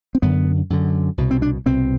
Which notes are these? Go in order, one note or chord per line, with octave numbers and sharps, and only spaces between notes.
C4
F#2 D3 B3
F#2 D3
C2 B2
C4
D4
C2 B2 C4